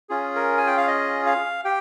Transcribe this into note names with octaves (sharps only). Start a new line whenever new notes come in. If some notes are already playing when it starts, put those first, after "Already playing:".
C#4 F4 G#4
A#4
G#5
G5
F5
D#5
F5
G4 G5